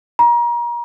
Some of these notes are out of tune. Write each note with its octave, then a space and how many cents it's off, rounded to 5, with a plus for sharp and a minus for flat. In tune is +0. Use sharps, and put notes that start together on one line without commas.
A#5 +35